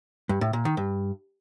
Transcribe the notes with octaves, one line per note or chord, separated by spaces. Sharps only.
G2
A2
A#2
D#3
G2